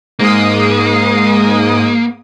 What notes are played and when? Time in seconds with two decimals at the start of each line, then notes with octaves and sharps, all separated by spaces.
0.19 G#2 G#3 A#3 D#6